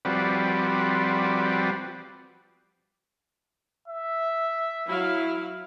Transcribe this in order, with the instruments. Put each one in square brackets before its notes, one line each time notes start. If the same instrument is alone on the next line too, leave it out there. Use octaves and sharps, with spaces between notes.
[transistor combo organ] F3 G3 C4 F#4 B4 D5
[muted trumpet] E5
[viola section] F#3 E4 F5